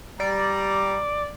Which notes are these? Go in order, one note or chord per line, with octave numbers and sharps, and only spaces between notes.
G3 D5 A#5